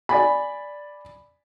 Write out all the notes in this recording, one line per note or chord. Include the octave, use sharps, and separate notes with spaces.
D5 G#5 B5